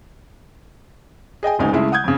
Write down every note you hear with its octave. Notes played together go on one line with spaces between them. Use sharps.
G#4 D#5 G5 G#5
D#1 D2 C#3 G#3 D#4 G#5
C#3 G#3 A3 E4
F#5 D#6 G6 G#6
F2 C#3